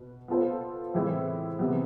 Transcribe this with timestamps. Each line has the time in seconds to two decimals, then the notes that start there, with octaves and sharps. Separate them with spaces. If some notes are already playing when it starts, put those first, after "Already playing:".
Already playing: B2 B4
0.28 B3 F4 A4 C5
0.94 A2 E3 G#3 C4 E4
1.59 C3 E3 B3